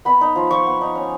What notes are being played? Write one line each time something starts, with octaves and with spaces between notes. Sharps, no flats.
B3 B5
D#4
F3
F3 C#6
B3
D#4
C#4